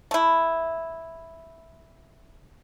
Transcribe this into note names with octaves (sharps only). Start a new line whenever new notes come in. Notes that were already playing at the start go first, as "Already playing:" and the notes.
A3 E4